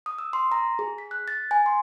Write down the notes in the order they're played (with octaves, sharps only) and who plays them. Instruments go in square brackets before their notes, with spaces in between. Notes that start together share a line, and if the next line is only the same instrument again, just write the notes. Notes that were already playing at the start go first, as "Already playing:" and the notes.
[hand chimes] D#6
E6
C6
A#5
G#4
B6
F#6
A6
G#5
C6